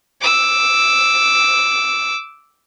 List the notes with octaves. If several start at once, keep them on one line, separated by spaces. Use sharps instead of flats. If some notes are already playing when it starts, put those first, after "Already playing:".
D6 E6